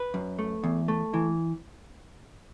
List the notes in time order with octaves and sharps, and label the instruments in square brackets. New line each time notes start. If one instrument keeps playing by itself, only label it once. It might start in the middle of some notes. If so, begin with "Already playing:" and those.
Already playing: [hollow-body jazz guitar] B4
F#2
A3
E2
A3
E3